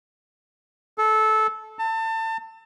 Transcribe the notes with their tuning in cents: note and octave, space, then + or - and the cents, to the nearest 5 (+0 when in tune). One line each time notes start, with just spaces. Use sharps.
A4 -20
A5 +30